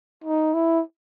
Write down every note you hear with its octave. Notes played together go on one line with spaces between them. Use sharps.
D#4
E4